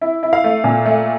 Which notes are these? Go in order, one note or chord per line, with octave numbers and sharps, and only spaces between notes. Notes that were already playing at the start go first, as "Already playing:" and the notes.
E4
E4
F5
A3
A#2
A3